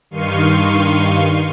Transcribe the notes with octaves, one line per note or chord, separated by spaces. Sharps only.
G2 D#3 F5 C6 C#6 D#7